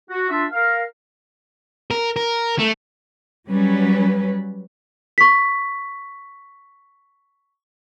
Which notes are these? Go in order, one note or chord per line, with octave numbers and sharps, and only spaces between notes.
F#4
D4 F4 E5
A#4 F5
A#4
A#4
A3
F#3 G3 C#4 B4
C#6 B6